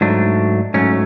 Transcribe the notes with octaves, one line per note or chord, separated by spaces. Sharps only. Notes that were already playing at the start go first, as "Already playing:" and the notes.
G#2 F#3 A3 D4
G#2 F#3 A3 C#4